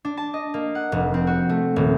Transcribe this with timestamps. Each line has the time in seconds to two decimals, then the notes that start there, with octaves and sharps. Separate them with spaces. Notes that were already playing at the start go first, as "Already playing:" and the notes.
0.05 D4
0.17 A5
0.34 D#5
0.54 A#3
0.75 F#5
0.92 F1
1.14 C4
1.27 F#4
1.49 A3
1.76 D#1